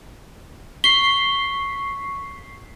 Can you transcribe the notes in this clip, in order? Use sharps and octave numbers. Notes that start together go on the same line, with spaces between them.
C#6 B6 C7 G7